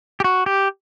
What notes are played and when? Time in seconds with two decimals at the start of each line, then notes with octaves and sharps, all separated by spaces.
0.20 G4
0.24 F#4
0.46 G4